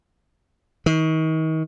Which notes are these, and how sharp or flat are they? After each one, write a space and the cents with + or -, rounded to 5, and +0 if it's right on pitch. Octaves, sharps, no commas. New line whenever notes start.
D#3 +35